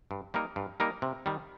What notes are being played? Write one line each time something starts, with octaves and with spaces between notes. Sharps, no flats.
G2
G3 A#3 D#4 A#4
G2
G3 A#3 D#4 A#4
C3
D#3 G3